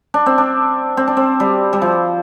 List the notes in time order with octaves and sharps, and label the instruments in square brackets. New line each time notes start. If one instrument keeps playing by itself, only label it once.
[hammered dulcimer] D4
C4
D4
C4
D4
C4
G3
G3
F3